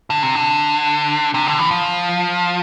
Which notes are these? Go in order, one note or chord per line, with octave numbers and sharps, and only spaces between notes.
D3
C3
D3
C3
D3
E3
F3